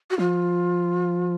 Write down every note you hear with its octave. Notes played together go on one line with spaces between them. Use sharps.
F#4
F3 F4